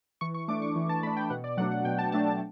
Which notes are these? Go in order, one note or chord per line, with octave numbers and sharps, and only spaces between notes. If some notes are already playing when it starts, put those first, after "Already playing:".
E3 C#6
C#6
A3 D4 D6
C#6
E3
A5
A3 D4 B5
G5
B2 F#5
D5
F#3 A3 D4 F#5
F#5
B2 G5
A5
F#3 A3 D4 A5
A5